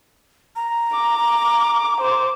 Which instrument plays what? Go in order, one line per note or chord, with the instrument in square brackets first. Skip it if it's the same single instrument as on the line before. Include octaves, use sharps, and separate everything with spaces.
[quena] A#5
[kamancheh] D6
C5 D6